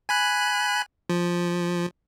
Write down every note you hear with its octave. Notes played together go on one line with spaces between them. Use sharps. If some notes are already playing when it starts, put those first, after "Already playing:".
G#5 B5 F#6
F3